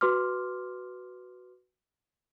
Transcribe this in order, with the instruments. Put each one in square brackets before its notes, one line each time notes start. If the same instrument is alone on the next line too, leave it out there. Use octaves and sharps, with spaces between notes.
[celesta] F#4 B4 C6 D6 F6